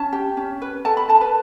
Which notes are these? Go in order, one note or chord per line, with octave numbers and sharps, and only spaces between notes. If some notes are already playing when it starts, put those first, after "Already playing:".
Already playing: C#4 A5
G4
C#4
B4
A4 A5
B5
A4 A5
B4